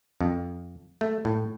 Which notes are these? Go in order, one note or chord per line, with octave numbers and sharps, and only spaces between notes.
F2
A3
A2